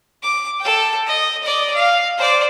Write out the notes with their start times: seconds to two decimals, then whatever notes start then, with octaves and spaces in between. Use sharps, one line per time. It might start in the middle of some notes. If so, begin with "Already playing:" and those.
0.23 D6
0.60 A4 G5
1.07 D#5
1.43 D5 D#5
1.75 F5
2.17 C5 D5